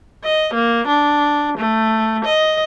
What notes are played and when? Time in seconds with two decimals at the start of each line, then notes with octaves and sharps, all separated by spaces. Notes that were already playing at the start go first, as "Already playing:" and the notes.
0.24 D#5
0.54 A#3
0.88 D4
1.58 A3
2.25 D#5